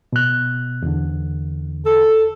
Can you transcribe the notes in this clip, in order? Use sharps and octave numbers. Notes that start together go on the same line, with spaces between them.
B2 F#6
E2 D3
A4